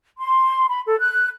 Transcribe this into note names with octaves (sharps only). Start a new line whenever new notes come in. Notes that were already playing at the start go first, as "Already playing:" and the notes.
C6
B5
A4
F#6